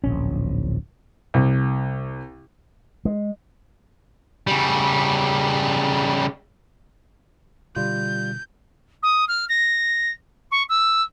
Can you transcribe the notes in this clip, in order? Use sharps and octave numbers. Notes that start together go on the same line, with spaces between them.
D1 A#1 C#4
C2
G#3
C#3 G3
B2 D3 G3 F4 G6
D#6
F6
A#6
C#6
E6